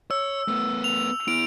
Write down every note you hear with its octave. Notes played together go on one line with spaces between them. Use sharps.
C#5 E6
A3 B3
F7
B3 E4 D7